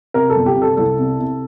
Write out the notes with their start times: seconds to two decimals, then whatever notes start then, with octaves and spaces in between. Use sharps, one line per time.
0.14 C3 A#4
0.30 A4
0.36 G1
0.46 G4
0.56 C3
0.62 A4
0.77 C2 A4
0.99 C3
1.20 C3